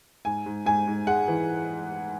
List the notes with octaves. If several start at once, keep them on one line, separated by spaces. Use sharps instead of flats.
G#2 G#5
G#2
G#2 G#5
G#2
G#3 F#5
E3